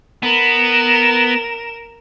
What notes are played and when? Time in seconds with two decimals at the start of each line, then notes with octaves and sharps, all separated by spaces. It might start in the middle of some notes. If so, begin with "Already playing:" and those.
0.22 B3 A#4 E7